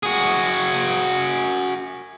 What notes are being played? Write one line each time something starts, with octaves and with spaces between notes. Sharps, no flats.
F#4 G#4